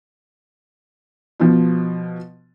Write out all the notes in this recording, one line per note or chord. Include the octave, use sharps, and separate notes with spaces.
B2 F3